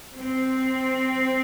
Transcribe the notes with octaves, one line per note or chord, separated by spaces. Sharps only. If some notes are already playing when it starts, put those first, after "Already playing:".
C4